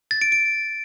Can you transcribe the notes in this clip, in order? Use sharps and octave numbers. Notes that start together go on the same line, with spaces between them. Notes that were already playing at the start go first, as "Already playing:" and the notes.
A6
D7
D7